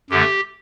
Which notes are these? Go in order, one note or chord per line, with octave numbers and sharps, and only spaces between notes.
F#2 D3 A3 G4